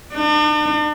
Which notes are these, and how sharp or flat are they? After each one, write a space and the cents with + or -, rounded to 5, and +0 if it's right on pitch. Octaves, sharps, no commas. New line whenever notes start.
D4 +45